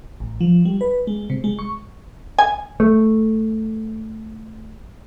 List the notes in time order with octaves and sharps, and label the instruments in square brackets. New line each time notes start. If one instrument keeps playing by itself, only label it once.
[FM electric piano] A1
F3
G3
B4
G#3
C3
G#3
C#6
[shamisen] G#5
[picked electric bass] A3